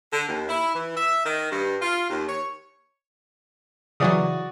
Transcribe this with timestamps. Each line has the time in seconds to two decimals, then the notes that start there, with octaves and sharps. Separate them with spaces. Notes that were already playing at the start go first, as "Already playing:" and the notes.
0.12 D3
0.28 D#2
0.48 E4
0.74 E3
0.95 E5
1.24 D#3
1.51 G2
1.82 F4
2.09 D#2
2.27 C#5
4.00 C#3 E3 F#3 F#4 D5 D#6